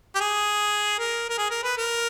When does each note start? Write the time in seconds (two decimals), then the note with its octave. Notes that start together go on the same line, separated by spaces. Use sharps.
0.15 G4
0.20 G#4
0.99 A#4
1.30 A#4
1.38 G#4
1.51 A#4
1.64 B4
1.77 A#4